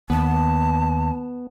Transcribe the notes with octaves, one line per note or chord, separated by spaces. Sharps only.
D#2 B3 A5